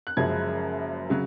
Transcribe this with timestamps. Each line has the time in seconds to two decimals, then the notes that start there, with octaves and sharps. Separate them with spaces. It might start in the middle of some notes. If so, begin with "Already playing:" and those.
0.07 F#6
0.17 F#1 F#2 C#3 F3 G#3 G#6
1.10 C#3 F#3